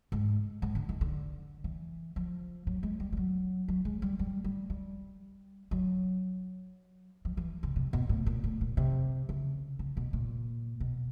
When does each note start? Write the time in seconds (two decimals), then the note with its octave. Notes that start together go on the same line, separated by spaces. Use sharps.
0.12 G#2
0.62 G#2
0.75 D3
0.89 D#3
1.01 D3
1.64 E3
2.16 F3
2.67 F#3
2.83 G#3
3.00 G3
3.12 G3
3.17 F#3
3.68 F#3
3.85 G#3
4.02 G3
4.19 G3
4.44 G3
4.70 G3
5.71 F#3
7.25 F3
7.37 E3
7.63 C#3
7.76 C3
7.93 B2
8.09 A2
8.26 A#2
8.44 A2
8.61 A#2
8.77 C3
9.29 C#3
9.79 C#3
9.97 B2
10.13 A#2
10.80 B2